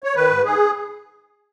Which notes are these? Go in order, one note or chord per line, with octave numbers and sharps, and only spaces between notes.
C#5
D#3 B4
G#2
G#2 G#4